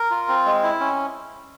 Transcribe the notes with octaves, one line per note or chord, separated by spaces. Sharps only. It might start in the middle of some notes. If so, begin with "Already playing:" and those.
Already playing: A#4
F4
C4
G#3
E4
C#4